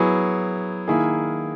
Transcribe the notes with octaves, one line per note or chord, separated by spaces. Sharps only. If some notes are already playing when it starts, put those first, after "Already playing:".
Already playing: F#3 B3 E4 G#4
D#3 A#3 E4 G#4